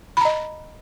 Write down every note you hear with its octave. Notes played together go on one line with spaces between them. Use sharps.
D#5 A#5 B5